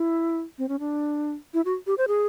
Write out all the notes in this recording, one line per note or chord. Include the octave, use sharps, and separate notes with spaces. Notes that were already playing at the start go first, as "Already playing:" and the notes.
Already playing: E4
C4
C#4
D4
E4
F#4
G4
C5
G#4